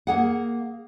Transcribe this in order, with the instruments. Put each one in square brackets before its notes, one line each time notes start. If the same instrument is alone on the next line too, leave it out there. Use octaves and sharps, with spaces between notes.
[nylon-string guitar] A#3 G#4 F#5